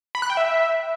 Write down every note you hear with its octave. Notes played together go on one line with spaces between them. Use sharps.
B5
F#6
G5
E5